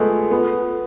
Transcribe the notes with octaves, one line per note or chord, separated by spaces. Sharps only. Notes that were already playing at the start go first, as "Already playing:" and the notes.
Already playing: G#3 A3 B3 F4 A4
B3